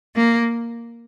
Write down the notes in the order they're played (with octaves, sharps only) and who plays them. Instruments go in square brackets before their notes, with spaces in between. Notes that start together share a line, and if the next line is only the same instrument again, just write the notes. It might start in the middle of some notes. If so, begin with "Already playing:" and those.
[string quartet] A#3